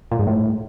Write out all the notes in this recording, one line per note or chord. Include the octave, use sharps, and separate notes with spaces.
A#2
G#2
A2